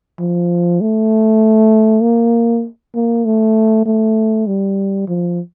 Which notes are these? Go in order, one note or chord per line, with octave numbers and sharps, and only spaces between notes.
F3
A3
A#3
A#3
A3
A3
G3
F3